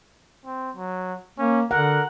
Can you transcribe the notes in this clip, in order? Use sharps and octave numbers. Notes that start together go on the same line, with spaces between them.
C4
F#3
A#3 C#4
D3 A#4 F#5